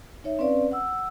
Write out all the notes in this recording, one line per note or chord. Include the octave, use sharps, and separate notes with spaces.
D#4 C#5 E5
C4 C#4 B4 D5 F5
F#5 E6